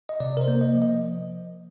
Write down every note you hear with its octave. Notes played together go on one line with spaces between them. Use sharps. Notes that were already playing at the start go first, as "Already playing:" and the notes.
D#5
C3 D5
A#4
C5
A#3
D#5
F3
D#5